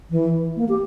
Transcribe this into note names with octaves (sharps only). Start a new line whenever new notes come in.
E3
A#3
G4